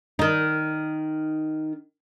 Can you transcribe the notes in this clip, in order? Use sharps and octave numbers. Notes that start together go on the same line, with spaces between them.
D#3 D#4